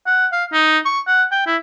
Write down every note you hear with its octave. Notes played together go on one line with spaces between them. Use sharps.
F#5
F5
D#4
C#6
F#5
G5
E4